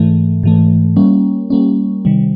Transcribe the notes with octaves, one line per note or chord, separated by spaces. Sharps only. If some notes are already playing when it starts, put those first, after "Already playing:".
Already playing: G#2 E3 A3
G#2 E3 A3
G3 A#3 C#4
G3 A#3 C#4
C3 D#3 G3